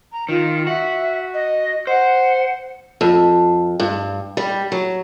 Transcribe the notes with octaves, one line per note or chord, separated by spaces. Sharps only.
A#5
D#3 F4
F#4 E5
D#5
C5 F#5
F2
G2
G3
F#3